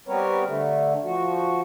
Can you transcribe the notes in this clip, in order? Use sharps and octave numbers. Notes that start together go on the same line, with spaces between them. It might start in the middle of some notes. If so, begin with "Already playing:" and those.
G3 B3 C4 A#4 B4 C#5
D3 A3
F3 F#4